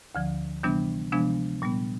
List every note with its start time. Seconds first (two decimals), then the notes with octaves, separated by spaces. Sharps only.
0.15 D2 D3 F3
0.63 C3 E3 G3 B3 D4
1.12 C3 F3 G#3 B3 D4
1.62 A#2 G3 B3